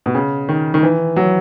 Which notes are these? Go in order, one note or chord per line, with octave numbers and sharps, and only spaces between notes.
B2
C#3
D#3
D#3
E3
F#3